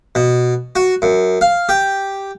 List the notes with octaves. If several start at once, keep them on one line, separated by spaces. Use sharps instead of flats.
B2
F#4
F#2
F5
G4